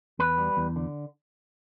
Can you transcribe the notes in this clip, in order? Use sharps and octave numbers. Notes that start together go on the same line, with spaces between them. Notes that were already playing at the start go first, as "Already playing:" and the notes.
E2 B4
G3
E2
D3